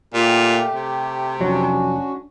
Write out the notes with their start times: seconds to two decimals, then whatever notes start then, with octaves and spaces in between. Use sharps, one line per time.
0.14 A#2 A3 G4
0.74 C3
1.40 F1 F#3 C#4 D4 F#4